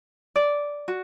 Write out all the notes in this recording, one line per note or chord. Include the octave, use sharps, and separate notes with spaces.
D5
F#4